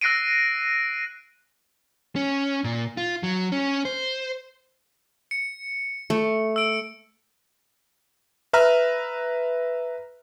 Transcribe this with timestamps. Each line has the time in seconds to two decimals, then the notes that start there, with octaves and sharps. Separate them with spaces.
0.01 E6 F#6 A#6 C7 D7 D#7
2.16 C#4
2.64 A#2
2.97 F4
3.23 F#3
3.52 C#4
3.85 C5
5.31 C#7
6.10 A3
6.56 E6 D7
8.53 B4 E5 A#5 F6 F#6